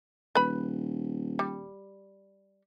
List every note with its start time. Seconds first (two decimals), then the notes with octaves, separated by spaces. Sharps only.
0.35 D#1 B4 B5
1.39 G3